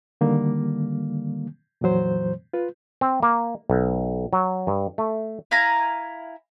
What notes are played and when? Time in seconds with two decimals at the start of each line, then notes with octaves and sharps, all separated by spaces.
0.21 D3 D#3 G3 A#3
1.81 F2 A#2 E3 F#3 C5
2.53 F4 B4
3.01 C4
3.23 A#3
3.70 B1
4.33 F#3
4.67 G2
4.98 A3
5.51 E4 F5 G#5 A#5